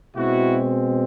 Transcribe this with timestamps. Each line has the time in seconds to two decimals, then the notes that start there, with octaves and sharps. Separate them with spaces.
0.16 B2 G#3 C4 E4 F#4